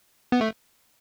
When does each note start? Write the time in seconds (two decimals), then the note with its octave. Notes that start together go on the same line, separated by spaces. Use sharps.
0.32 B3
0.41 A3